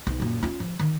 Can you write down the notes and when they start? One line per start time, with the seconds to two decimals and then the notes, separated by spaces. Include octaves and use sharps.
0.07 B1
0.20 F#2 A#2
0.43 C#4 F4
0.60 F3
0.79 D#3